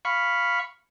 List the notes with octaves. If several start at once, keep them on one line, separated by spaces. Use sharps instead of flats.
F5 B5 C#6